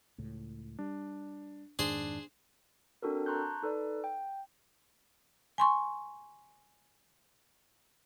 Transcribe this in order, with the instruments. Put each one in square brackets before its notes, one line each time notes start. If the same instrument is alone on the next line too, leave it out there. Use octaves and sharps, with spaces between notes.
[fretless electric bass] C#2 A2
[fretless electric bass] G3 [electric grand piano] D4
[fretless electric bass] F2 G#2 D#3 [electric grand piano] D4 [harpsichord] G#4 C5
[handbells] C4 D4 F#4 A4 A#4
A5 A#5 C6 C#6 F#6 G6
D#4 A4 B4 D5
G5
[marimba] G#5 C6 C#6